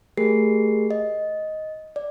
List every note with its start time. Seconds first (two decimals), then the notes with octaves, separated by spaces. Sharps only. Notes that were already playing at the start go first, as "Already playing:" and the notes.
0.17 A3 G4 G#4 A#4 C7
0.91 D#5
1.96 D5